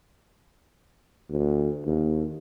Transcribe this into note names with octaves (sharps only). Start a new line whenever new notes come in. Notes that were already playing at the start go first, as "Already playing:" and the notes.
D2
D#2